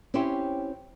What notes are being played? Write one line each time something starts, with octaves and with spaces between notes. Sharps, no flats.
C4 C#4 E4 G4 C5 C#5